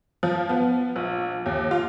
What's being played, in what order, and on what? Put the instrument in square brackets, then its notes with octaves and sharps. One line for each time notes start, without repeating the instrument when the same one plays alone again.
[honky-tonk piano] F3
B3
A#1
D#2
F4